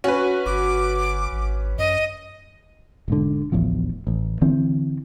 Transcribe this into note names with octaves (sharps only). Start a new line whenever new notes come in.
C#4 F#4 B4
G1 D6
G#1
F#2 D#5
E1 G#2 D3
D1 A1 E2 F3
A1
D3 E3 C4